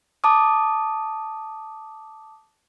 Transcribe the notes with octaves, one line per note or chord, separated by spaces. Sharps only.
A5 D6 D#6